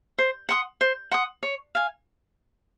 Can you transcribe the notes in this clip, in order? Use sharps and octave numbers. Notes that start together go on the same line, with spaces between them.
C5
F#5 C6 D#6
C5
F#5 C6 D#6
C#5
F5 G#5